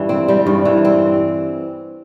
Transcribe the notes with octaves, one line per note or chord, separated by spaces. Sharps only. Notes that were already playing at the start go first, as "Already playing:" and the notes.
Already playing: G2 E3 G3
C4
G3
G2
E3
C4